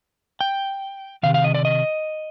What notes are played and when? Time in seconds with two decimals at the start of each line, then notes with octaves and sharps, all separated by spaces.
0.41 G5
1.23 C3 D#3 F5
1.34 F5
1.44 D#5
1.55 D5
1.65 D#5